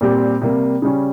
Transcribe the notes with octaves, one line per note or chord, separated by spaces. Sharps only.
A#2 G3 C4 G4
C3 G3 A#3
C#3 G3 C#4